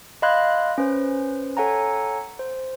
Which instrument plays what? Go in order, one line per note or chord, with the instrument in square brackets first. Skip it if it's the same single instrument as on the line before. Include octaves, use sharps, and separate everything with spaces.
[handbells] D#5 F5 B5 C6 F#6 G#6
C#4 B4 C5
A4 C#5 F#5 G#5 A#5
C5